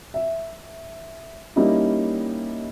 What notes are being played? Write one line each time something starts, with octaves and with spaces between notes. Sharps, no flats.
E5
G3 A#3 C#4 D#4 E4 G4